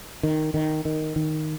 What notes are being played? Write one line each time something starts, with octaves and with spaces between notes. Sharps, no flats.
D#3
D#3
D#3
D#3